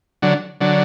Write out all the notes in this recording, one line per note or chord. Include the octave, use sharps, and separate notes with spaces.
D3 F#3
D3 F#3